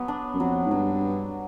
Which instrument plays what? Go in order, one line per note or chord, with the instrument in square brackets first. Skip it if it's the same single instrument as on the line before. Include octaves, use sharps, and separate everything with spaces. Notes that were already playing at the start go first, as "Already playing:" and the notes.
Already playing: [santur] F#3 B3
D4
[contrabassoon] F#2
[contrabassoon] F2 [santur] F#3
[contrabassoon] G#2
[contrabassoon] G2 [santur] F#3